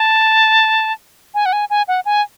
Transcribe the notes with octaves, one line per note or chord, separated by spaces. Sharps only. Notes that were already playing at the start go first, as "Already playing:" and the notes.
Already playing: A5
G#5
F#5
G#5
G#5
F#5
G#5